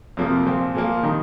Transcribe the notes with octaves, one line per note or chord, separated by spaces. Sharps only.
F2 C3 F3 A#3
A#2 F3 C4
A#2 F3 A#3
D#3 G3 D#4